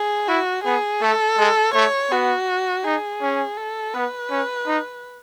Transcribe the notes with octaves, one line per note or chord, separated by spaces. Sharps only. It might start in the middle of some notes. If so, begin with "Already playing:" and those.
Already playing: G#4
E4 F#4
B3 G#4
A3 A4
G#3
A3 C#5
B3 F#4
D#4 G#4
C#4
A4
B3 B4
C#4
D#4